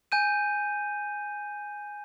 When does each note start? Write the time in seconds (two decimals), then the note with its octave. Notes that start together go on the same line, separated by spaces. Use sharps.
0.12 G#5 G6 D#7